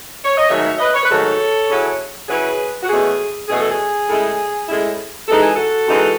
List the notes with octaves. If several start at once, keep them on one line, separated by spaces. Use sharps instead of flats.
C#5
D#5
G#2 D#3 F#3 A3 C#5 E5
C#5 E5
B4 D#5
C#5
B4
G#2 D#3 F#3 A3 A4 C#5
C#3 F#3 C#4 E4
C#3 F#3 C#4 E4 G#4 B4
F#4
E2 B2 A3 C#4 G#4
E2 B2 A3 C#4 G#4
A4
G#4
A2 G#3 C#4 E4
A2 G#3 C#4 E4
F#2 E3 G#3 D#4 A4
G#4
F#4 A4
F#2 E3 G#3 D#4